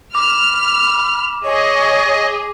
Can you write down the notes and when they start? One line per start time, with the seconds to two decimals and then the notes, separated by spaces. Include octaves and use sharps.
0.15 B5 D6 F6
1.43 G#4 C#5 D#5